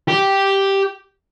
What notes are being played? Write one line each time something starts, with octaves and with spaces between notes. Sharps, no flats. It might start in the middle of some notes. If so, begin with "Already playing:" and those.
G4